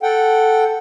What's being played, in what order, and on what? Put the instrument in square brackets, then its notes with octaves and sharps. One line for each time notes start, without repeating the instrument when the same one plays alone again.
[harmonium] A4 F#5 G5